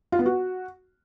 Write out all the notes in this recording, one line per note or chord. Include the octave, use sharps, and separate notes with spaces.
F4
B3
F#4